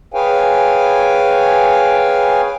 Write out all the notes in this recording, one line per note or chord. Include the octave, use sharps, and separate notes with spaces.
G#4 B4 C#5 F5 G5 G#5